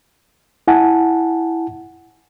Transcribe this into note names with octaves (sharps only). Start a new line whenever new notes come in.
E4 F#5 G#5 A5